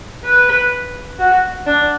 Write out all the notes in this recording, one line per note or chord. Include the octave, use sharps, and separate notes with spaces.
B4
F#4
D4